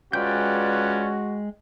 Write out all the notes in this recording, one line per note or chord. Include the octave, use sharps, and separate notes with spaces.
G#3 C#4 F4 F#4 B4 D5 G5 G6